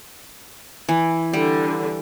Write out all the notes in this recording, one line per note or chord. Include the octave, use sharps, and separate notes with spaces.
E3
D3 G3